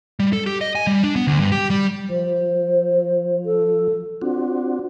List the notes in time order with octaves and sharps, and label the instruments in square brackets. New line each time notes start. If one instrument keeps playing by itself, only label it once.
[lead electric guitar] G3
A4
G4
D#5
G#5
G3
D4
B3
D2
G2
G4
G3
[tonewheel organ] F3 [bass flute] C5
[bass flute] A4
[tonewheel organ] C4 D4 F#4 [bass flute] F4